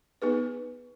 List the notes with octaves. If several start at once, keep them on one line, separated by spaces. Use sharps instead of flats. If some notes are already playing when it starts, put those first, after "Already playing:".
B3 D#4 G#4 B4